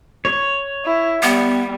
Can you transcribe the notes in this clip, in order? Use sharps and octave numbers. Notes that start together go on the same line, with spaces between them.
C#5
E4
G3 B3